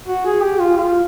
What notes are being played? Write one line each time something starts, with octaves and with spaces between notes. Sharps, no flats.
F#4
G#4
G4
F4
F4